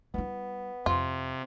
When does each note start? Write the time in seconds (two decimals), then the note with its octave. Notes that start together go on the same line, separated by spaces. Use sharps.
0.14 G3 B3 E4
0.86 F2 C3 F4